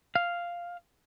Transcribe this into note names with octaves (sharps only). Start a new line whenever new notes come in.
F5